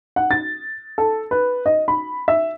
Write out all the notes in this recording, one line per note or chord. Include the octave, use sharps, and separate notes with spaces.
F#5
A6
A4
B4
D#5
B5
E5